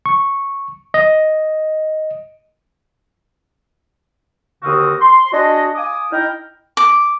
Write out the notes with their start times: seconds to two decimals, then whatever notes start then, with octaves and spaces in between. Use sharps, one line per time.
0.06 C#6
0.94 D#5
4.63 D#2 D3 C4 F#4 F5 D#6
5.01 C6
5.32 D4 F#4 G#4 D#5
5.76 F5 G#5 D6 D#6
6.12 D#4 E4 A#4 G5
6.77 D6